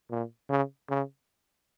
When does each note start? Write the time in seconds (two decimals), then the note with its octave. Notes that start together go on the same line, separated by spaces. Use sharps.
0.10 A#2
0.49 C#3
0.89 C#3